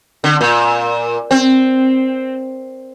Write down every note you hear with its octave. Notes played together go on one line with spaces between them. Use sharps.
D3
A#2
C4